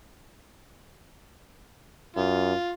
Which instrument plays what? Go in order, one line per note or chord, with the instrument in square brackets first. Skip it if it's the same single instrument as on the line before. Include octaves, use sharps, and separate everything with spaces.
[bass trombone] F#2 [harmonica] F4